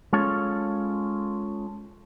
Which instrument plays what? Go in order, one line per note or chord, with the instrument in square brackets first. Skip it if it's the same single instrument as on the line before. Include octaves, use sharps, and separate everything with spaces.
[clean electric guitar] G#3 C#4 F4 A4 C#5